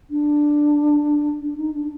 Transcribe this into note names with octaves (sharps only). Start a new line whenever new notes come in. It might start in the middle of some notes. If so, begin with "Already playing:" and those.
D4
D4
D#4
D4